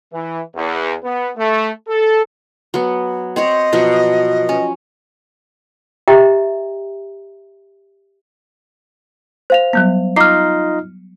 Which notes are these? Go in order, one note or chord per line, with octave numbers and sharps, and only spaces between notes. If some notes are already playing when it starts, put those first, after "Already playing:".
E3
E2
B3
A3
A4
F#3 B3
C4 C5 C#5 D#5
B2 F3 F#3
C#4
G4 D#5 E5 G5 A#5
C5 F5 F7
F#3 G3 B3
D#4 F4 D#5 A#5 D6 F6 C7